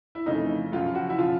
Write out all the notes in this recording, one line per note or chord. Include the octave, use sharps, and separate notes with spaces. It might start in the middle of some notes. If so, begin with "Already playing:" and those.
E4
F2 C#3 E3 A3 D#4
F#2 C#3 F3 F4
F#4
E4
C#3 F3 F4